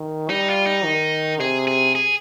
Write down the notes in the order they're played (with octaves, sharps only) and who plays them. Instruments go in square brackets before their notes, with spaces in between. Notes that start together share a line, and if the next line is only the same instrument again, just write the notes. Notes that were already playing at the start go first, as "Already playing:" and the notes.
Already playing: [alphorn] D#3
[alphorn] G3 [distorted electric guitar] D#4
[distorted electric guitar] F4
D#4
[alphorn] D#3
[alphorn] C3 [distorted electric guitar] G#4
[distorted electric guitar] G#4
G#4